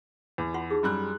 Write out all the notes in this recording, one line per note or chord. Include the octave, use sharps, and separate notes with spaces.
E2
F4 F#5 C6
D#4 G4 G#4
F#2 G3 E4 F#6